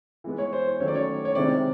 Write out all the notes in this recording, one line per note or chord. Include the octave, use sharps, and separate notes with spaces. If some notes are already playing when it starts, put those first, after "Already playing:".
E3 G#3 B3
C#5
C5
C5
D#3 F#3 A3 C#4 C#5
D5
C#5
C#5
C3 D#3 G#3 C4 E4 D5